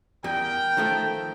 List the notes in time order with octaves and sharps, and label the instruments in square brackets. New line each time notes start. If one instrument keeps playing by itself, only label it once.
[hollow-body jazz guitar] E2 G3 [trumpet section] A#4 G5
[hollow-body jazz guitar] D#3 F3 A3